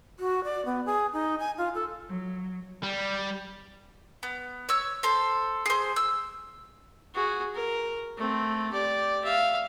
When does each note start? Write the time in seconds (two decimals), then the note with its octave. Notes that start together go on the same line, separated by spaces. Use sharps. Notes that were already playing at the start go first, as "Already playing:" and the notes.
0.20 F#4
0.44 D5
0.66 B3
0.86 G#4
1.13 D#4
1.39 G#5
1.58 F4
1.75 A4
2.09 F#3
2.83 G3
4.23 B3
4.69 C#5 E6
5.03 A4 C5
5.66 G#4 C5
5.96 E6
7.15 F#4 G#4
7.54 A#4
8.18 A3 C4
8.72 G4 D5
9.24 E5 F5